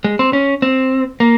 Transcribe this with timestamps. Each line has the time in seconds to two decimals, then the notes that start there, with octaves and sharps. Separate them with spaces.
0.04 G#3
0.19 C4
0.33 C#4
0.62 C4
1.20 A#3